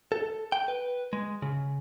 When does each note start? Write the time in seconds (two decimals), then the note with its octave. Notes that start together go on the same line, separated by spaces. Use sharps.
0.12 A4
0.52 G5
0.68 B4
1.13 G#3
1.42 C#3